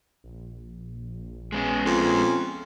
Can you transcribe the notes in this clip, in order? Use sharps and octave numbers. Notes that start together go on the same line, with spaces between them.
A#1
G#3 B3 C#4 G#4
F2